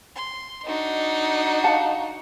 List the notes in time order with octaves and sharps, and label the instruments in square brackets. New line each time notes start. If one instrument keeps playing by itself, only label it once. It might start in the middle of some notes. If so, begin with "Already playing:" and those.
[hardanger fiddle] C6
[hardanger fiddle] D4 F#4 [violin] D#4
[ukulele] F5 F#5 A5